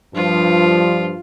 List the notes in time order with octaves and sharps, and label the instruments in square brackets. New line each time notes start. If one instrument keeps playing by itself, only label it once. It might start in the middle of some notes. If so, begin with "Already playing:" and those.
[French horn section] G2 F3 [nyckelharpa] F4